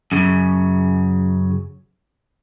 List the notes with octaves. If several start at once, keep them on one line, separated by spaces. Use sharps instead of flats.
F#2 C#3